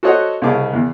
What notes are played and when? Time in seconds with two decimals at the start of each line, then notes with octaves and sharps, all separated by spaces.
0.03 F#4 A4 C5 C#5 D#5 F#5
0.42 C2 C#3 D#4 G#4 A5 D6
0.74 E2